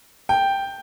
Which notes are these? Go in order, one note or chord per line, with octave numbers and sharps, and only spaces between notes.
G5